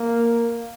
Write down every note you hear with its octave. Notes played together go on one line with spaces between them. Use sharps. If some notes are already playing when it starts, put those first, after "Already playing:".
Already playing: A#3